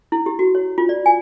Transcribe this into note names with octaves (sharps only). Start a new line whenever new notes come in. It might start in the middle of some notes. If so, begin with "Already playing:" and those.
E4
G4
F#4
C#5
F4
D5
G#5